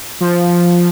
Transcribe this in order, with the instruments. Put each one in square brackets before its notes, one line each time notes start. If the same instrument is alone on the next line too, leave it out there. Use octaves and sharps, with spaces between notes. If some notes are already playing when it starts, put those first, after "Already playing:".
[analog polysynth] F3